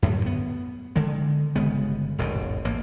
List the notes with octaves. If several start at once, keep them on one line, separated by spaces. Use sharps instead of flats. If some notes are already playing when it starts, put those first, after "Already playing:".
F#2 A2 D3 F#3
B3
D3 D#3 G#3
G1 C#3 G#3 B3
E1 A1 G#2 B2
A1 A#3